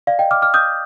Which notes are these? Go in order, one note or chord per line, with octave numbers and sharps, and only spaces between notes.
D5 F5
D#5 G5
D6 F6
D6 F6
D#6 G6